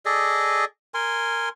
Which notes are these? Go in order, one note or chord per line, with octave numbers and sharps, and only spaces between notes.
G#4 A4 D5 D#5
A#4 G#5 C6